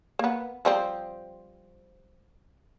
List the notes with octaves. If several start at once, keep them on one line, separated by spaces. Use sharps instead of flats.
A#3 B3
F3 G3 C4